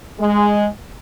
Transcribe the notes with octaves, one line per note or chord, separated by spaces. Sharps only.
G#3